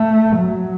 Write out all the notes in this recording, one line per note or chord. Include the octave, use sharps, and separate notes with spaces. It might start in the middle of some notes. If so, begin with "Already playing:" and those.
Already playing: A3
F#3